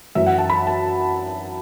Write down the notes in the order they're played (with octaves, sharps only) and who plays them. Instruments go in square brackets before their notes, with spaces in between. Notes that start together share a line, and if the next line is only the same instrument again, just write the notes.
[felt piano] F#2 E3 E5
F#5
A5
B5
A5